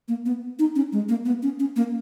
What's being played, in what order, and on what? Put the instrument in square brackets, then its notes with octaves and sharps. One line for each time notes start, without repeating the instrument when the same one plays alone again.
[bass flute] A#3
B3
D#4
C#4
G#3
A#3
B3
C#4
C#4
A#3